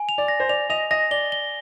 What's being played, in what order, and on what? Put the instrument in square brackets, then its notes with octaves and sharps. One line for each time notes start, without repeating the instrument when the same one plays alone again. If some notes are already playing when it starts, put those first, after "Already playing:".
Already playing: [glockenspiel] G#5
F7
[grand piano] D5
[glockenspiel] A#6
[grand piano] C5
[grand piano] D5 [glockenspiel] F7
[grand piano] D#5 [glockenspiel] F7
[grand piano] D#5 [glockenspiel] A#6
[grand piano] D5 [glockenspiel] G7
[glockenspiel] G7